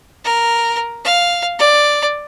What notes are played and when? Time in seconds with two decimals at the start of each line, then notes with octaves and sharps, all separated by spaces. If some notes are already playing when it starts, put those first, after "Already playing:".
0.24 A#4
1.05 F5
1.59 D5